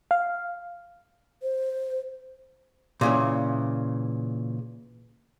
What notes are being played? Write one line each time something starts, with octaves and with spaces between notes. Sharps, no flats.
F5
C5
A#2 C#3 E3